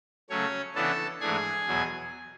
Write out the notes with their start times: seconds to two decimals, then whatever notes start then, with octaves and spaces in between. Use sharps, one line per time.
0.30 C#3 F#3 A3 C#4 C#5
0.75 C#3 E3 B3 D4 A4 A5
1.21 G#2 E3 A3 D4 G#4 G#5
1.66 E2 B2 F#3